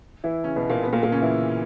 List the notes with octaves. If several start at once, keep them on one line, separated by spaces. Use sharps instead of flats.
E3 E4
C#3 C#4
B2 B3
A#2 A#3
B2 B3
A#2 A#3
A#2 A#3
C#3 C#4
E3 E4